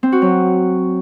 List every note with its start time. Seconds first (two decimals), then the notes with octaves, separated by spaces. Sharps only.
0.03 C4
0.12 F#4
0.22 F#3